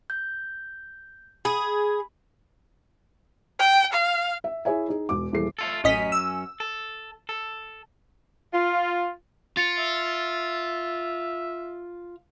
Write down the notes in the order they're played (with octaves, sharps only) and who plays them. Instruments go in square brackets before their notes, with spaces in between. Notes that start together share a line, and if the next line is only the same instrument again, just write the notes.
[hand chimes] G6
[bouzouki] G#4 [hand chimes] B5
[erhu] G5
F5
[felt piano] E5
E4 G#4 C#5 E5 G#5
D#4 G#4
E1 D6
D#1 E3 G#4 A4 C7
[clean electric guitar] A3 F4 A4
[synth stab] A1 D#5 B6 [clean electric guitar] F#2 C#4
[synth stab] E6
[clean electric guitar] A4
A4
[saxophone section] F4
[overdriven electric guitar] F4 [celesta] A6 C#7 F7
[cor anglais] E5